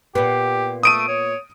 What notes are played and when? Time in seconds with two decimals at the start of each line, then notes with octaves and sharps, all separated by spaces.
0.15 A#2 B3 G4
0.83 A3 D#6 D7 D#7
1.08 C#5